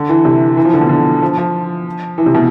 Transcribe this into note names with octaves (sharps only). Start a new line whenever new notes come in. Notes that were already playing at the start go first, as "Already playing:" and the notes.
Already playing: D3
E3
C3
E3
F3
D3
B2
D3
F3
F3
E3
C3
B2